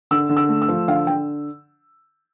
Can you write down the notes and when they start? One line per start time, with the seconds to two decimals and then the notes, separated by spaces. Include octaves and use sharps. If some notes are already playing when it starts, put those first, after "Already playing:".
0.11 D3 E6
0.29 D3
0.37 E6
0.49 A3
0.62 E6
0.68 F3
0.88 D3 F5
1.07 D3 G5